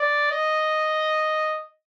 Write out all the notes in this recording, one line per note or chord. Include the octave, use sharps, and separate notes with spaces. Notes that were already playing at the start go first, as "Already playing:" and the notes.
Already playing: D5
D#5